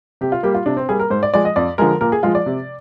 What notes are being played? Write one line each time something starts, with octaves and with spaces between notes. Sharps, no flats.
C3 G4
F4
G3 A#3 G4
F4
C3 D4
C4
G3 A#3 G#4
A#4
G#2 C5
D5
F3 G#3 D5
D#5
F2 D5
D3 F3 G#3 A#4
A#2 A#4
G#4
F3 G#3 F4
D5
C3